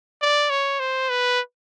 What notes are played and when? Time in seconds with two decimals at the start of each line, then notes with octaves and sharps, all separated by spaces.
0.22 D5
0.50 C#5
0.79 C5
1.09 B4